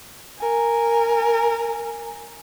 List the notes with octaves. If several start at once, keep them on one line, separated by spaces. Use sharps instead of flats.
A#4 G#5